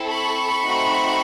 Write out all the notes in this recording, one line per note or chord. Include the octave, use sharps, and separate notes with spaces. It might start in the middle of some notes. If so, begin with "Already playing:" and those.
Already playing: C4 E4 A4
B5 C#6
A3 C4 D#4 F#4